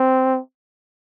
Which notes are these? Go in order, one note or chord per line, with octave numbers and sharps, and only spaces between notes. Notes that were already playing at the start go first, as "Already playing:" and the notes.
Already playing: C4